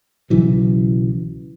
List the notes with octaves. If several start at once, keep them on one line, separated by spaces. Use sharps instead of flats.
B1 C#3 E3 F#3